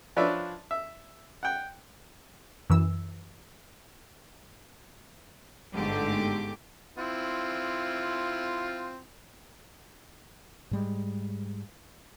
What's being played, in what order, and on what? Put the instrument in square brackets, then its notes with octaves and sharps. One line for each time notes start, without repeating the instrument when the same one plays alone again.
[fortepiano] F3 D4 B4 C#5 D5 E5
E5
F#5 G5
[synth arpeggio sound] F#2 E3 E6
[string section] G1 G#2 D3 A3 G4 D6
[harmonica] C4 E4 F4
[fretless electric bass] G#2 G3 G#3